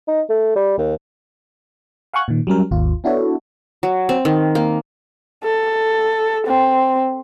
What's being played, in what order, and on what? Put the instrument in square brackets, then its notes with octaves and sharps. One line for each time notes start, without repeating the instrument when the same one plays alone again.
[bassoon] D#4
A3
G3
D#2
[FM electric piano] F5 F#5 G#5 C#6 F#6
A#2 D#3
F#3 G3 C#4 A#4
G#1 D#2 F4
B3 D4 E4 F#4 A4 C#5
[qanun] F#3
C4
D#3
A#3
[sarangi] A4
C4